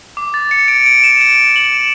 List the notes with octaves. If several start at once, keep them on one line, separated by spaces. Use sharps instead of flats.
D6
A6
C#7
D7
D7
E7
D7
F#7
E7